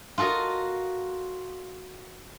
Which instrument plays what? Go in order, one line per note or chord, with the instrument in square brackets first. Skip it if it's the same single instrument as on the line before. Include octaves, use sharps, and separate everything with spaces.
[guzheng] F4 F#4 A4 A#4 D#5